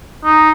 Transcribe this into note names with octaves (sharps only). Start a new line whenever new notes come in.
D#4